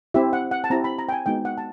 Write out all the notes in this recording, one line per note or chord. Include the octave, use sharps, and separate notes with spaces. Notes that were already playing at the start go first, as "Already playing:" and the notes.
C4 E4 G4 E5
F#5
F#5
A5
C4 E4 G4 A#5
B5
A#5
G5
G#5
G#3 B3 D#4 F#4 G5
F#5
A5